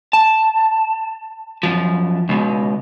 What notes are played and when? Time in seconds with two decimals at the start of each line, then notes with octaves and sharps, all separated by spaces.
0.13 A5
1.63 F#2 F3
2.29 C#2 B2